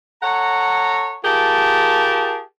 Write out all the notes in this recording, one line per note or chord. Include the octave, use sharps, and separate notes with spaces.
A4 C#5 F#5 A#5
F4 G4 G#4 A#4 A5